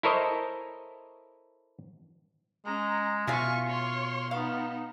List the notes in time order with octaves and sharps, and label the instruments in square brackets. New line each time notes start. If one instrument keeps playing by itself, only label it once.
[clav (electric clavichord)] E4 A4 A#4 C5 C#5 D#5
[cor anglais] G#3 [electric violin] C#4 A#5
[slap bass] B2 [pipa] E4 G#4 F5 [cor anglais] F4 [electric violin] G#5 C#6
[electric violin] C#5 C6
[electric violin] B3 D#4 [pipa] F5